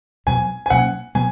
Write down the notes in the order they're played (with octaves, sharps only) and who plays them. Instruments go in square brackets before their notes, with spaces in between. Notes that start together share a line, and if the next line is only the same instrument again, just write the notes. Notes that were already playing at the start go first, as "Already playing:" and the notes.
[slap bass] E2 B2 F#3 B3 [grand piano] G#5
[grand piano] G#5
[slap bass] B2 F#3 A#3 C#4 [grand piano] F#5
[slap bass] B2 F#3 B3 [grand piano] G#5